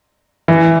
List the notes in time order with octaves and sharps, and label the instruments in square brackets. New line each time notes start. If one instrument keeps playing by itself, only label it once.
[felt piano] E3